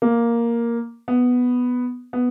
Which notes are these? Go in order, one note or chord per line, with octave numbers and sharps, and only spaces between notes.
A#3
B3
B3